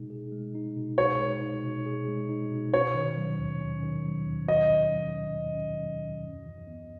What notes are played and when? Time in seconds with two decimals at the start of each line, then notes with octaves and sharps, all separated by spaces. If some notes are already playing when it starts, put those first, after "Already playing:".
Already playing: B2 G#3 D#4 G#4
0.10 G#4
0.32 G#3
0.55 D#4
0.76 B2
0.98 G#4 C#5
1.20 G#3
1.42 D#4
1.63 B2
1.86 G#4
2.08 G#3
2.29 D#4
2.51 B2
2.73 C#4 C#5
2.95 D#3
3.17 F#3
3.39 D#2
3.60 C#4
3.83 D#3
4.05 F#3
4.27 D#2
4.48 C#4 D#5
4.70 D#3
4.92 F#3
5.14 D#2
5.36 C#4
5.58 D#3
5.80 F#3
6.02 D#2
6.24 F#2
6.45 E3
6.67 B3